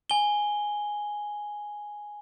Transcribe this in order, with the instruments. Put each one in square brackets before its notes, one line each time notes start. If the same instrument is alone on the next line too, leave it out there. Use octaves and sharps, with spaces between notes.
[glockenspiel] G#5 G7